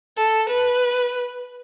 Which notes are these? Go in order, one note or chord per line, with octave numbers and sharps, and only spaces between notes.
A4
B4